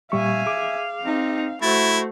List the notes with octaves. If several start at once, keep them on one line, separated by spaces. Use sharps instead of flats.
A#2 G3 E5 F5 G#5 C#6
G#4 D6
C4 D#4
A3 E4 F#4 C5 A6